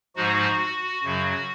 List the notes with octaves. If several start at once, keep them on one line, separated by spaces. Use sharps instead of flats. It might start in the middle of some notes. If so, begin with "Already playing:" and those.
G#2 F3 G#3 D#4 F#4
F#2 C#3 F#3